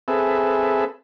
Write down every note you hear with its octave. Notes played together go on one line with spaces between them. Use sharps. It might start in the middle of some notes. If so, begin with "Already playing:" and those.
C4 G#4 A4 B4 E5